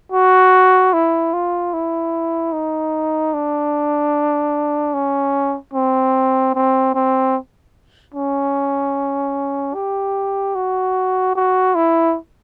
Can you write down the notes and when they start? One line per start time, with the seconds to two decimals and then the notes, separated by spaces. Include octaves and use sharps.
0.12 F#4
0.93 E4
1.33 F4
1.73 E4
2.53 D#4
3.33 D4
4.94 C#4
5.73 C4
6.54 C4
6.94 C4
8.14 C#4
9.74 G4
10.55 F#4
11.35 F#4
11.75 E4